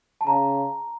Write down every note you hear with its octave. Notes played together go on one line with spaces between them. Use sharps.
A5
C#3 A#5